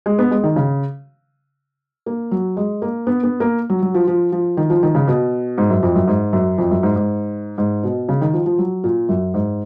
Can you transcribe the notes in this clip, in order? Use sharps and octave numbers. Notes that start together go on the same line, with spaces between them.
G#3
B3
G#3
D#3
C#3
A#3
F#3
G#3
A#3
B3
B3
A#3
F#3
F#3
F3
F3
F3
D#3
F3
D#3
C#3
B2
G#2
F#2
F2
F#2
G#2
F#2
F2
F#2
G#2
G#2
G#2
B2
C#3
D#3
F3
F3
F#3
A#2
F#2
G#2